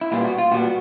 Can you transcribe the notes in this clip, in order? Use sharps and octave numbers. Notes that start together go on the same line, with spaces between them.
E4
A#2 G3 B3 F4
F#4
F4
A#2 G3 B3 F#4